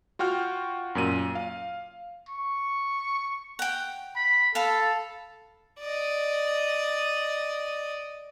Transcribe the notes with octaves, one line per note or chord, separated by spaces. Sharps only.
F4 F#4 G5 F6 G6
F#2 A#2 D#7
F5
C#6
F#5 G5
B5
A4 F5 A5 B5
D5 D#5